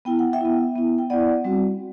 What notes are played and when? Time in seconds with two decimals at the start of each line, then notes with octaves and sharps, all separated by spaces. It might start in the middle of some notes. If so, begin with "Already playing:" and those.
0.05 B3 E4 G5
0.19 F#5
0.33 E5 G5
0.41 B3 E4
0.76 B3 E4
0.98 G5
1.10 B3 E4 D5 F#5
1.44 G3 C4 F#4